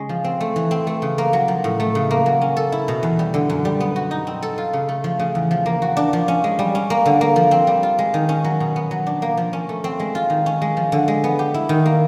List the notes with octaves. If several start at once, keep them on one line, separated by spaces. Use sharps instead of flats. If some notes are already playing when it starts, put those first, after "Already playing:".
Already playing: C#3 G#3 C#4
F3
C4
A3
E3
C4
A3
C#3
A#3
F#3
F3
A2
A3
C#3
A#3
F#3
C#4
A4
E4
B2
E2
G3
D3
F#2
G3
B3
F#4
D#4
C4
A4
F4
C#3
A3
F3
C#3
E2
F3
A#3
F#4
D4
F3
C#4
G#3
G3
C#4
A#3
D3
A#3
F3
C4
G3
F4
G#3
D#3
C#4
F#3
B2
B3
F#3
D4
A#3
F3
C#4
A3
C4
G#3
F4
D#3
C#4
G#3
F3
D3
G#3
B3
G4
E4
D#3
A#3